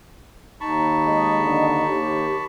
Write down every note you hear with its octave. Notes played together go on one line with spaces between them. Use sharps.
D#2 D#4 A5 B5 C#6
G#3 D#5
D3
D#2 G4